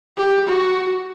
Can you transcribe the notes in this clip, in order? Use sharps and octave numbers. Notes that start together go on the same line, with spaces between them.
G4
F#4